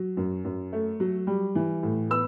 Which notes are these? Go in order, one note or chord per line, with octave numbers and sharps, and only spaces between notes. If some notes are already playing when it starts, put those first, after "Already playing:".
Already playing: F#3
F#2
F#2
A3
F#3
G3
E3
A2
B3 E6